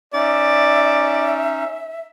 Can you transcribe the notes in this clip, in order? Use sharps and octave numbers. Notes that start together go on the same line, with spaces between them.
C#4 D#4 D5 E5